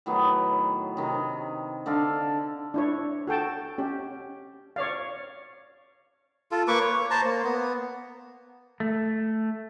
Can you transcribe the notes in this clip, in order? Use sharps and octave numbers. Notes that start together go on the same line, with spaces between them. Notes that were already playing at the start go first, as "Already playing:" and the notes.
A2 D#3 F#3 B3
C3 D#3
D3 A4 D5 F5
D4 E4 C#5
F#4 A4 G5 A5
C#4 G4
C#5 D5 F5
F4 A4
A#3 B4 C#6 D6
C#5
C5 A5 A#5
A#3
B3
A3